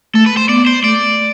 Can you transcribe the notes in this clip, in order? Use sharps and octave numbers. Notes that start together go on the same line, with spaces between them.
A3 A4
B4
C5
B3 D5
C5
A3 D5